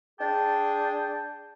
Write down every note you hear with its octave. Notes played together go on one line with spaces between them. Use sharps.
D4 G#4 G5 A5